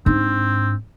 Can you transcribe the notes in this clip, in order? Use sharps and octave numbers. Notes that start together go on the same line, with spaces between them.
G#2 C4 D4